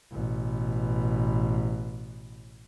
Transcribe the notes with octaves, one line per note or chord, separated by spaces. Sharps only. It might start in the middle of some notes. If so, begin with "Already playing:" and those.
A1 B2